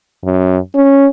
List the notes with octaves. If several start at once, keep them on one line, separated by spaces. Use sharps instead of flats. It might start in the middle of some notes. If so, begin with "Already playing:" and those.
F#2
C#4